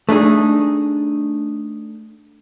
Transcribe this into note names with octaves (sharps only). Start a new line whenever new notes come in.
A3 D4 D#4 G#4